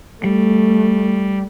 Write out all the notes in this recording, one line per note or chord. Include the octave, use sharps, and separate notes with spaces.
G3 A3